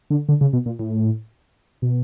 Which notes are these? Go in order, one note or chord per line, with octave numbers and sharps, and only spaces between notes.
D3
D3
C#3
B2
A#2
A2
B2